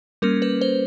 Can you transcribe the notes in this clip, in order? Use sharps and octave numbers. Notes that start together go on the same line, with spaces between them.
G3 A#3 C#4 A#4
B4
C5